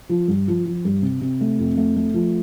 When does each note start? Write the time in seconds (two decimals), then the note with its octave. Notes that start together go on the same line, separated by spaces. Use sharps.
0.09 F3
0.28 G2
0.48 F3
0.66 F3
0.85 G2
1.02 C3
1.21 C3
1.41 A3
1.59 F2
1.77 A3
1.96 A3
2.14 F3